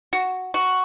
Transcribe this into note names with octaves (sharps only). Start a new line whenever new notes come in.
F#4
F#4